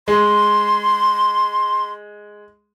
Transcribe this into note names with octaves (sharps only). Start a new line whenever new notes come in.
G#3 C6